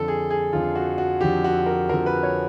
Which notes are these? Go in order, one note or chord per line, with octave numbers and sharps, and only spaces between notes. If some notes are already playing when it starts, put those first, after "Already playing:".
Already playing: F2 D3 F3 A4
G#4
G#4
F2 D3 F3 F4
F#4
F#4
F2 D3 F3 G4
F#4
A#4
F2 D3 F3 A#4
B4
C#5